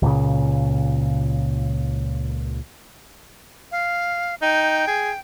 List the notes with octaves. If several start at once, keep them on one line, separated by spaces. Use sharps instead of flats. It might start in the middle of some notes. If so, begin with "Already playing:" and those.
C#2 A#2 C#3
F5
D#4 G5
G#4